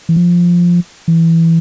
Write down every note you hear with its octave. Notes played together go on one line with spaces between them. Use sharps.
E3
F3
E3